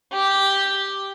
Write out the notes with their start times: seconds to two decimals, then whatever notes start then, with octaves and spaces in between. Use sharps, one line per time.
0.13 G4